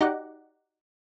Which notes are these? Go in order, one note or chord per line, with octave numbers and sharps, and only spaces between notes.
D#4 F#4 G4 D5 F#5